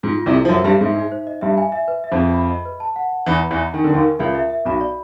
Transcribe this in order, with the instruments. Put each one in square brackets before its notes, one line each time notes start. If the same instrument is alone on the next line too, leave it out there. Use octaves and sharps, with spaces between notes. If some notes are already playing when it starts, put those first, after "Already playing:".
[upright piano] G#2 [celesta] F4
[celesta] F4
[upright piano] C2 C3
[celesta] A4
[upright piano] F3
[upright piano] F#2 F#3 [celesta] E5
[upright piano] G2 G3 [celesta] C5
[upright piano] G#2 G#3 [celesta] E5
[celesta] D#4
C5
D#5
[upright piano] G2 G3 [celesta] E5
[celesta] G#5
E5
B4
E5
[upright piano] F2 F3
[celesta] G#4
B5
D#5
B4
A5
F#5
F#5
[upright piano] E2 E3 [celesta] B5
[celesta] B4
[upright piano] E2 E3
[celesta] D#5
[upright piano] D#3 [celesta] G#5
[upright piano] D3
[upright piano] D#2 D#3 [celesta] A#4
[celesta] A#4
[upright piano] C#2 C#3 [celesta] E5
[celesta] E5
E5
[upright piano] B1 B2 [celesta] B5
[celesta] D5